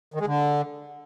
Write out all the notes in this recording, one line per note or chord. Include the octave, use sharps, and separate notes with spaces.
D#3
G#3
D3